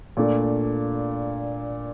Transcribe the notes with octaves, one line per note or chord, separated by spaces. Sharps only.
A#2 A3 D4